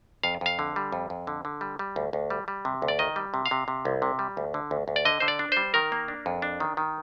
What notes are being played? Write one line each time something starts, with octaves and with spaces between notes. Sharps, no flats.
F2 F5
F2 F5
D3
G3
F2
F2
D3
D3
G3
G3
D2
D2
G3
G3
C3
D2
D5
D#3 D#5
G3
C3
F5
C3
C3
C2
C3
G3
D2
D3
D2
D2
D5
D3 D#5
D3 C5
D5
D4
G3 C5
D#3 A#4
A#3
D4
F2
D4
D#3
D#3